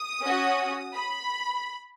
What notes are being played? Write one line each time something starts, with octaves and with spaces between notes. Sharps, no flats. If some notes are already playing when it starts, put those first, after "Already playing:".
Already playing: D#6
C#4 F#4
B5